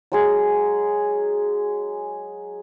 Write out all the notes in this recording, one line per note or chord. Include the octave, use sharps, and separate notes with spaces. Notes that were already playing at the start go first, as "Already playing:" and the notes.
F#3 G#3 G#4